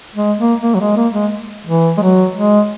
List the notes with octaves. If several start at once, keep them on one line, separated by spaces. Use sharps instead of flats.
G#3
A#3
A#3
F#3
G#3
A#3
G#3
E3
G#3
F#3
G#3